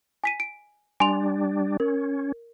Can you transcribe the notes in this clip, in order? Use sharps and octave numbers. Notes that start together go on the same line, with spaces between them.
G#5 B6 D#7
D7
G3 D4 G#5 C6 F7
C#4 A#4